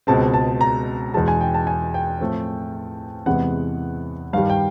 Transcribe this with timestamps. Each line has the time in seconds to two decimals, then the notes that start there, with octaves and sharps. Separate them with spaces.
0.07 C#2 B2 G#3 C4 A5
0.34 A5
0.61 A#5
1.14 E2 B2 G#3 A5
1.28 G#5
1.41 G5
1.54 A5
1.67 G#5
1.94 G5
2.20 A2 F3 A3 C4
3.26 E2 C3 E3 G#3 B3 F#5
4.33 G2 D#3 G3 F5
4.50 G5